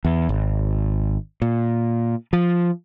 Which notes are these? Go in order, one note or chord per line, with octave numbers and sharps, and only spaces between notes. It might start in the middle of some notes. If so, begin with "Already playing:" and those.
E2
G#1
A#2
F3